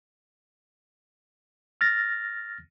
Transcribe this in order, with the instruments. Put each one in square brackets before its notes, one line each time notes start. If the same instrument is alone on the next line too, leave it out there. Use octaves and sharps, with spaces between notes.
[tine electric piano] F6 A6 A#6